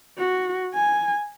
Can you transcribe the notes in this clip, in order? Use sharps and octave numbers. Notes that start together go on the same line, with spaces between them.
F#4
G#5